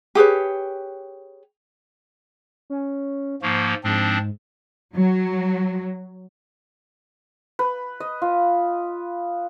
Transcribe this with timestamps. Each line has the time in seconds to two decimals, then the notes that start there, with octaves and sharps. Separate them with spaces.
0.15 G4 G#4 B4 C#5
2.70 C#4
3.42 G#2 F3 A#3 C#6
3.84 G#2 F3 C4 D4
4.95 F#3
7.59 B4
8.00 D#5
8.22 F4